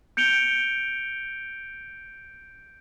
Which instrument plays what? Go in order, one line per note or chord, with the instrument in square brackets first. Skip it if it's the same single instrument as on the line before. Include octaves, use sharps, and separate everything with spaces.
[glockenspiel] G6 C#7 D7 F7 G7